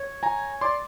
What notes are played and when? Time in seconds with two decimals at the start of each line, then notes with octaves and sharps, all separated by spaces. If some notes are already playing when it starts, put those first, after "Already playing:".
Already playing: C#5
0.23 G#5 A#5
0.61 D5 C6 D6